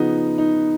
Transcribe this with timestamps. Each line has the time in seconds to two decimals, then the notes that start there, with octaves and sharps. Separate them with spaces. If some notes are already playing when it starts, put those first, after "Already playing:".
Already playing: C#3 F3 B3 D#4
0.38 D#4